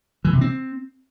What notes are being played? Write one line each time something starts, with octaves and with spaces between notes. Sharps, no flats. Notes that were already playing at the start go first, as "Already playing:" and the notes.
E3
C3
C4